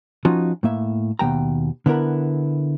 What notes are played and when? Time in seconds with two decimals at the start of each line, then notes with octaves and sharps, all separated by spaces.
0.25 F3 C#4 D#4 F4 F#4
0.63 A2 A#3 E5
1.19 D#2 B2 F3 G5 A#5
1.86 D3 B3 E4 A#4 B5